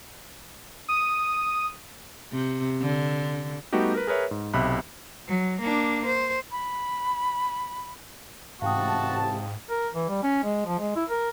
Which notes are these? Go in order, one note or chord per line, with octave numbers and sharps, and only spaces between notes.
D#6
C3
D3
G3 A3 B3 D#4 F#4 G4
A#4 B4
G#4 A#4 B4 C#5 E5
G#2
B1 C3 E5 B5 F#6
F#3
A#3 D4
C5
B5
A1 G#2 C3 F#4 F5 G5 A5 D#6
A#4
E3
G3
C#4
G#3
F3
G#3
E4
A#4